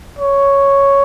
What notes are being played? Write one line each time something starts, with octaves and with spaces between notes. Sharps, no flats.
C#5